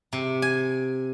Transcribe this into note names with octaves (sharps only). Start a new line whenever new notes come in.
C3
G#5